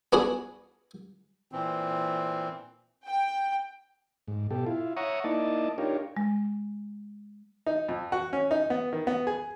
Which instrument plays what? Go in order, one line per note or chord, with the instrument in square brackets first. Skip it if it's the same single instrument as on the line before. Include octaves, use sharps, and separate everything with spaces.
[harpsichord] B3 D4 F#4 G#4
[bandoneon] A#2 E3 C4
[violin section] G5
[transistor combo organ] G#2
B2 G4 A4
E4 F4
C#5 E5 F#5 A#5 C#6 D#6
A#3 D#4 E4 D5 D#5 A5
D4 D#4 F4 G4 A#4 C#5
[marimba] G#3
[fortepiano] D#4
F2
F#4
C#4
D#4
B3
D#3
B3
G#4